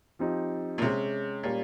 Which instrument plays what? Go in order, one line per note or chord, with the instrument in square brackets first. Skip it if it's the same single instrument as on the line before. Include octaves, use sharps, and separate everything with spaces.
[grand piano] F3 C4 D#4 G4
[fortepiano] A#2
[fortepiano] C3 [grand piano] G#3 C#4 G#4
[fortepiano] A#2 [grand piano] G3 C#4 F4